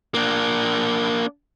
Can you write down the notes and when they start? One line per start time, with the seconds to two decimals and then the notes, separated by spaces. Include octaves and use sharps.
0.14 A#3 D4